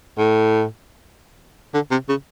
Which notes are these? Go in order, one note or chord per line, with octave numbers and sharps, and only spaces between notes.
A2
D3
C3
C#3